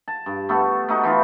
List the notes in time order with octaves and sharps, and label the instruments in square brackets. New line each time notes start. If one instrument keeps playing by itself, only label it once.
[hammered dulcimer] A5
G2
A3 B3 A4
A3 D#4 F#4
E3 D#4 F4